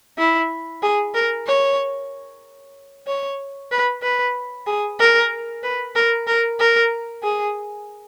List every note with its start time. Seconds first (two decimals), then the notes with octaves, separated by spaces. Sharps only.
0.18 E4
0.83 G#4
1.14 A#4
1.47 C#5
3.07 C#5
3.71 B4
4.03 B4
4.67 G#4
4.99 A#4
5.63 B4
5.95 A#4
6.27 A#4
6.60 A#4
7.23 G#4